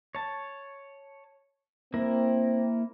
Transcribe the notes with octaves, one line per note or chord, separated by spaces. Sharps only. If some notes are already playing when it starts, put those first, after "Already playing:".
C#5 A5
A#3 C4 E4 A#4